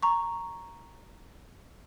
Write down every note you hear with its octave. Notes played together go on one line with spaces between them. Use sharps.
A#5 C#6